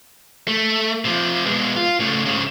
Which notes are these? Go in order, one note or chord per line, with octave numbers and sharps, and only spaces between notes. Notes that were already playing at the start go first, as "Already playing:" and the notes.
A3
C3 F3
B2 G#3
F4
C#3 A3
G#2 C#3